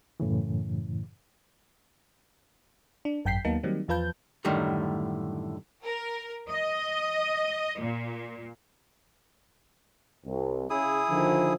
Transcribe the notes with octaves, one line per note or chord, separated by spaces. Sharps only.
F#2 A2 C#3 E3
D4
G#1 F#2 G5 G6 B6 C7
D#2 F#3 A#3 B3 D#4 A5
D#3 F#3 G3 A#3 C4 D#4
E2 F3 F4 B4 A5 G6
F#2 A2 D3 D#3 G3 A3
A#4
D#5
A#2
C2
C#3 E4 G#4 D#6
D3 D#3 F3